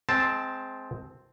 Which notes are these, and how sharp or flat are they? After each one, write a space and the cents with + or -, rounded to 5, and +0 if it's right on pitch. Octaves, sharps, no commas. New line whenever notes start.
G#3 +25 C4 +0 A5 +0